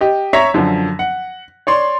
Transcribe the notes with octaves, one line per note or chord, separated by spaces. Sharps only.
G4 D#5
C#5 E5 A#5 C#6 A#6 B6
F#2 D3 F3
F#5
C#5 D5 C6